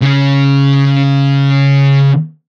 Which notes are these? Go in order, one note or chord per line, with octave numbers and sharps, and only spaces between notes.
C#3 C#4